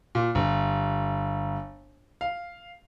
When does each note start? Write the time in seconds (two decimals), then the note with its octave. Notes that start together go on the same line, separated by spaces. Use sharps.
0.15 A#2
0.35 G1
2.21 F5